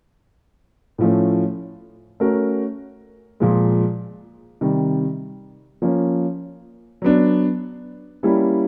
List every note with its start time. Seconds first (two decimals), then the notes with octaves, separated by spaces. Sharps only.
0.98 A2 F3 A3 C#4
2.20 A3 C#4 F#4 A#4
3.40 A#2 F3 G#3
4.61 C3 D#3 G3
5.82 F3 A#3 C#4
7.02 F#3 B3 D4
8.23 G3 A#3 C#4 E4 G4